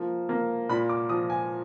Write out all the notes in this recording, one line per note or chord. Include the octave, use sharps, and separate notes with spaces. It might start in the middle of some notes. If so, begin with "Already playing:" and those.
Already playing: F3 A#3
A#3
A#2 B5
D6
F3 D#6
G#5